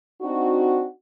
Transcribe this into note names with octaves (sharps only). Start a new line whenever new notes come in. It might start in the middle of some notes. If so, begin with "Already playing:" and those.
C4 D4 D#4 F#4